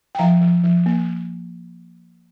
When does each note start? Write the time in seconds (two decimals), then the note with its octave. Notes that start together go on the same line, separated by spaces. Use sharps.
0.15 G5
0.19 F3 F5 A#5
0.41 F3
0.64 F3
0.86 A#3